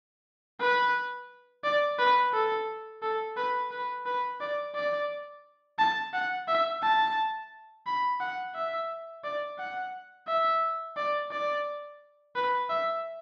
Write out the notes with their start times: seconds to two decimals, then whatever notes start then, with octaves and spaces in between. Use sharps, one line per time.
0.60 B4
1.64 D5
1.98 B4
2.33 A4
3.02 A4
3.36 B4
3.71 B4
4.06 B4
4.40 D5
4.75 D5
5.79 A5
6.13 F#5
6.47 E5
6.82 A5
7.86 B5
8.20 F#5
8.55 E5
9.24 D5
9.59 F#5
10.27 E5
10.97 D5
11.31 D5
12.35 B4
12.69 E5